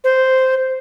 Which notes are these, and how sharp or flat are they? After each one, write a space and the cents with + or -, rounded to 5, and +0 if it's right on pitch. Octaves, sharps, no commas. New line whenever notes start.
C5 -5